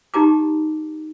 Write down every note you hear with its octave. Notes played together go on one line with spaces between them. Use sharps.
D#4 G4 A#5 D6